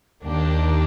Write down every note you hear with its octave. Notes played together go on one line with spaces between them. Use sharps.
D#2 D#3 A#3 D4 G4